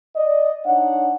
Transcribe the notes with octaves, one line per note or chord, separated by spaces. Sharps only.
D5 D#5
D4 D#4 C#5 F#5